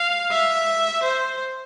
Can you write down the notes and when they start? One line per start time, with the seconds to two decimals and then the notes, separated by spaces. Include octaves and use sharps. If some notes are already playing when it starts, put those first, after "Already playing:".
Already playing: F5
0.31 E5
1.02 C5